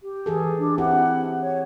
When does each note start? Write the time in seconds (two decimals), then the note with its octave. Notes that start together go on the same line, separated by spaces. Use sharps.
0.01 G4
0.26 E3 G#4 A4
0.58 D4
0.78 C4 E4 G4 F#5
1.41 C#5